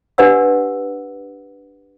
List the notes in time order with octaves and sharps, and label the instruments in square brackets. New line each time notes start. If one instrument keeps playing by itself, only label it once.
[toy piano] D4 G4 B4 D5 F#5 E6